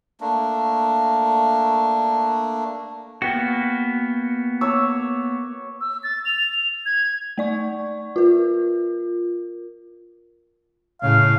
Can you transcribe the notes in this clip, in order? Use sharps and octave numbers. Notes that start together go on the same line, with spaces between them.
A3 A#3 D4
A#3 B3 F#4 G5
C#5 D6 E6
E6
A6
F7
G#6
A3 D5 C#6
F4 A#4
A2 C#3 F5